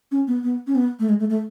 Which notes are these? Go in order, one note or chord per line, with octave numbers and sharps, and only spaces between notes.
C#4
B3
B3
C#4
B3
A3
G#3
A3
A3